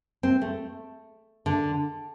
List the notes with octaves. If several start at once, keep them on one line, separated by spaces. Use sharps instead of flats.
C4
A3
D3